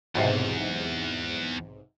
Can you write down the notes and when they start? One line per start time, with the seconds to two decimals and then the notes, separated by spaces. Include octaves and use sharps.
0.15 B1 E2 G#2 C3